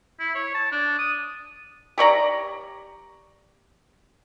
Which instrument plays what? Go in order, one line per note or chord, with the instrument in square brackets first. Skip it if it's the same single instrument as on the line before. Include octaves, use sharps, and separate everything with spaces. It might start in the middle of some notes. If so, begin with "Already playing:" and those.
[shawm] E4
C#5
A5
D4
D#6
[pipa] G4 C#5 D5 A#5